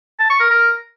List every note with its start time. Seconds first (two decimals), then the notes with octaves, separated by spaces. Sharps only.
0.19 A5
0.30 C#6
0.40 A#4
0.50 A#4